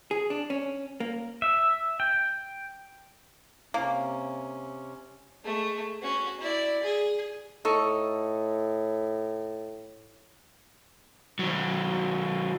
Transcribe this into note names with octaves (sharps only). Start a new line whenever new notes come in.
G#4
D4
C#4
A#3
E5
G5
C3 A#3 C#4
G#3 A3
C#4 F#4
E4 D5
G#4
A2 D#4 A4 C#6
D#3 F#3